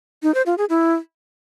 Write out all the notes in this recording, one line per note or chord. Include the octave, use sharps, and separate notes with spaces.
D#4
C5
F4
G#4
E4